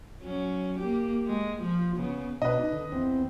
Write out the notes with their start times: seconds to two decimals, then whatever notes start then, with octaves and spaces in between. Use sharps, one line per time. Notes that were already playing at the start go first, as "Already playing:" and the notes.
0.21 F#3 C#4
0.79 A#3 G4
1.27 G#3
1.62 F3
1.97 C#3 B3
2.42 B2 D4 B4 D#5
2.59 D#4
2.72 D3
2.92 E2 C4